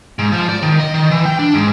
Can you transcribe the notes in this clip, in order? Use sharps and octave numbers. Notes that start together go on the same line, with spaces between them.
G#2
F3
D5
D#3
D#5
D#3
E3
G5
D4
G#2